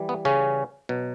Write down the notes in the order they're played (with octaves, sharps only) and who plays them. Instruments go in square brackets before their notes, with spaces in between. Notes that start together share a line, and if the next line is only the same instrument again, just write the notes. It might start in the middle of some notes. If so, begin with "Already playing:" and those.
Already playing: [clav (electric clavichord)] E3 G3
B3
C#3 C#4
B2 F#3